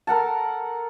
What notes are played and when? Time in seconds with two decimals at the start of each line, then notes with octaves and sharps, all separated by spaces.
0.07 A4 A#4 F#5 A5